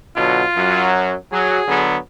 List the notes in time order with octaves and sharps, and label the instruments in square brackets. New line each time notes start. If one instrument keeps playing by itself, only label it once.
[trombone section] B2 D3 F#3 [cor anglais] F4
[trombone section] F#2 F#3
[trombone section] F#3 [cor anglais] G#4
[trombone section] D3 F#3 B3